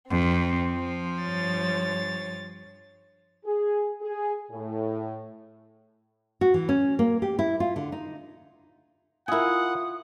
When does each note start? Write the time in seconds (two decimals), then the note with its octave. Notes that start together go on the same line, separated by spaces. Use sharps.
0.10 F2 C4
0.72 F3
1.23 G2 C#5 A6
3.45 G#4
4.02 G#4
4.51 A2
6.41 F#4
6.54 E3
6.69 C#4
6.99 A#3
7.22 G4
7.39 E4
7.60 F4
7.76 D3
7.92 D#4
9.28 E4 F4 A#4 F#5 G#5 D#6